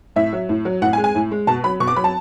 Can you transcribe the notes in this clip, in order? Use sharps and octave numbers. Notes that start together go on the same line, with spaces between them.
A2 E5
F#3
A2
F#3
A2 F#5
G#5
G#3
G#5
A2
G#3
B2 A5
F#3 B5
B2 C#6
D6
F#3 B5
A5